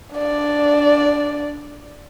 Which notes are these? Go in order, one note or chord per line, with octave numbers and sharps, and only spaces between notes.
D4 D5